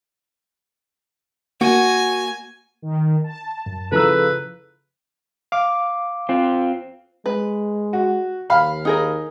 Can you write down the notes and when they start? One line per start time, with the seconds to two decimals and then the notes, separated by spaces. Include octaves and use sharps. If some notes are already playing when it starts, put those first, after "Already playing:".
1.61 A#3 F#4 G#5
2.82 D#3
3.24 A5
3.66 F#2
3.92 C#3 F3 E4 A4 B4 A#5 E6
5.52 F5 D6
6.29 C4 F4
7.26 G#3 B4
7.93 F#4
8.50 D#2 F5 B5
8.85 D#4 G#4 A#4